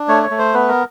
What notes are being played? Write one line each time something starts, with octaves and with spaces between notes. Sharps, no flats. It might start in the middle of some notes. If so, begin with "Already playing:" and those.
Already playing: D4
A3 C#5
C#5
A3
C5
B3 B4
A#4